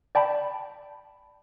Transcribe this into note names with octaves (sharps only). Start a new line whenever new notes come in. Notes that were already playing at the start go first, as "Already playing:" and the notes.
D5 G5 A5 B5